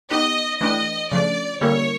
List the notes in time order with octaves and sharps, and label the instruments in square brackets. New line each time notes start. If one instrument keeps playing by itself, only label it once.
[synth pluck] B3 D#4 G4 B4 [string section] D#5
[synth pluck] E3 A3 D4 G4 B4 [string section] D#5
[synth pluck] C#3 F3 A3 D4 [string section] D5
[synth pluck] D3 G3 A#3 C#4 E4 [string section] C#5